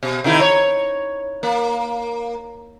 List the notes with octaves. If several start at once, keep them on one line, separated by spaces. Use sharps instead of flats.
B2
C3 D#3 E4
C#5
A#3